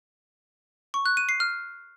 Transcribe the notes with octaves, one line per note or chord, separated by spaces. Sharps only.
C#6
F#6
D#7
C7
F6